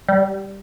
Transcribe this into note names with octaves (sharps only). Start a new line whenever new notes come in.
G3